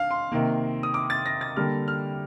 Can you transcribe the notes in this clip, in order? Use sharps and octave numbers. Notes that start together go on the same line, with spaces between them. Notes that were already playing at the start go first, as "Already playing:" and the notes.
Already playing: D#3 D4 F5
C6
C3 D#3 A#3
D#6
D6
A6
A#6
A6
D3 G3 A#3 F6
F6